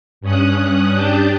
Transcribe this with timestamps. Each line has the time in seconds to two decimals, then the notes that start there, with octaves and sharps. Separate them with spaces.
0.21 G2 C#4 D#6 F#6
0.95 D4 G4 A5 G6